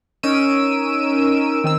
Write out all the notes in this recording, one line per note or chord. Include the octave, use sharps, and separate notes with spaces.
C#4 D#4 A#4 E6 D7 D#7
D#3 C4 E6